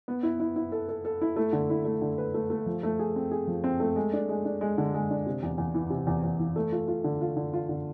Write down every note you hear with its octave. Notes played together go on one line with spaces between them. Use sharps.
B3
E4
E4
E4
A4
A4
A4
E4
A3
D3
E4
A3
D3
B4
A3
A3
F3
A3
G#4
C4
G#4
F3
C4
A3
G#3
D4
G#3
D4
G#3
D3
G#3
D4
C3
E2
E2
E3
C3
E2
E2
E3
A3
F4
F4
D3
F4
D3
F4
D3